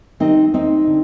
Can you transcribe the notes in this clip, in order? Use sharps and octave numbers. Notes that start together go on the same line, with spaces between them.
D#3 G3 C4 D#4
D#2 C4 D#4
D3